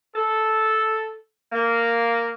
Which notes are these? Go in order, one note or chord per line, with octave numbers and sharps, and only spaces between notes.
A4
A#3